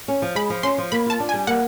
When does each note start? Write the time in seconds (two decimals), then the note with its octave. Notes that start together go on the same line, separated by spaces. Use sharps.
0.08 C#4
0.22 F3
0.35 G#3 B5
0.50 F3
0.63 C#4 C6
0.78 F3
0.92 A#3 B5
1.06 F4 A5
1.20 D4
1.29 G3 G#5
1.47 A#3 F#5